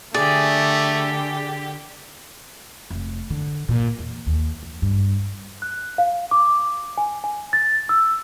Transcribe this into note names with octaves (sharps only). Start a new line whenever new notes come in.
D3 A3 G4 G#4 D5
F1
D3
A#2
E2
D#2
F2
G2
F#6
F5
D6
G#5
G#5
A6
E6